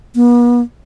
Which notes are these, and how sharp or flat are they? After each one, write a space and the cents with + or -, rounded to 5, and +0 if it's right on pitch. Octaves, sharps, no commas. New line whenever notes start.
B3 -40